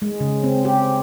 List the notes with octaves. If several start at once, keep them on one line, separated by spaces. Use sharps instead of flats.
G#3
C#3
C4
G4